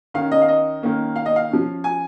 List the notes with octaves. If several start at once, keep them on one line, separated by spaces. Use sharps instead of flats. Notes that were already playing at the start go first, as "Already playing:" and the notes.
D#3 C#4 F5
D#5
F5
D#5
D#3 A#3 C#4
F5
D#5
F5
F3 C#4
G#5